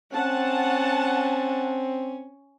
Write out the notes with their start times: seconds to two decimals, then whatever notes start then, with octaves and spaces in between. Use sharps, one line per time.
0.13 C4 C#4 F#5 A5